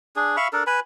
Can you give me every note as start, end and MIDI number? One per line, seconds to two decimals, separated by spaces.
0.16 0.36 62
0.16 0.36 68
0.37 0.48 76
0.37 0.48 77
0.37 0.48 83
0.37 0.48 85
0.53 0.64 62
0.53 0.64 69
0.53 0.64 70
0.67 0.80 71
0.67 0.80 80
0.67 0.80 83